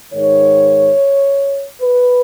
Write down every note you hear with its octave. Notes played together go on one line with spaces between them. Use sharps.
G#2 D#3 C#5
B4